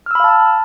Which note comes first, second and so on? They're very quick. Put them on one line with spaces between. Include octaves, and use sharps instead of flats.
F6 E6 B5 F5 A5